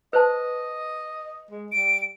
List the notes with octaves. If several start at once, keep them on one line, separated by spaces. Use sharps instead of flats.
B4 C5 D#5 A5
G#3
G3 D7